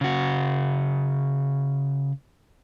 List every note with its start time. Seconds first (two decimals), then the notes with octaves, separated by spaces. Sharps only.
0.01 C#3 F#4